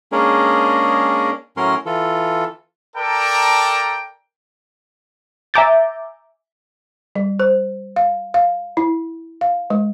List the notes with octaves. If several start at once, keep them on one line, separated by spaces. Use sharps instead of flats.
G#3 A#3 C#4 D4 G#4 A#4
A2 F#3 C#4 A#4 C6
E3 F4 A4
A4 A#4 D5 G5 A5 A#5
E5 G#5 A#5 D6 G6 A6
G3
C5
F5
F5
E4
F5
G#3